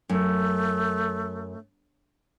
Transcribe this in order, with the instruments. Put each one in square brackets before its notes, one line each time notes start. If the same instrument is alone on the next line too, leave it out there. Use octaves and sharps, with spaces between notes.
[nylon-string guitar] F#2 [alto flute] A3